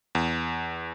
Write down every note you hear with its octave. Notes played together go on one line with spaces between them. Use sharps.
E2